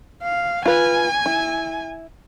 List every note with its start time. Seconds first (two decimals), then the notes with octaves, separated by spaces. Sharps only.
0.23 F5
0.65 F4 B4 G#5
1.26 E4